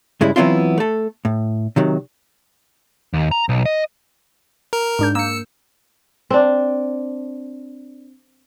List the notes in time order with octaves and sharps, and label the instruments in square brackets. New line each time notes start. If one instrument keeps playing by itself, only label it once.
[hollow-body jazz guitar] G2 C#3 G#3 E4
E3 F#3 B3 C4 E4 F4
A3 A4
A2
C3 D#3 F#3
[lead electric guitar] D#2
A#5
B1
D#5
[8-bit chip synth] A#4
[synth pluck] G#2 D4 G6
[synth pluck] A#3 [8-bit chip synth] E6 C#7
[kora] C4 D4